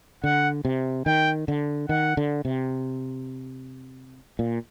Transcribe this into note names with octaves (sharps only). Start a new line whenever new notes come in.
D3 F#5
C3
D#3 G5
D3
D#3 F#5
D3
C3
A#2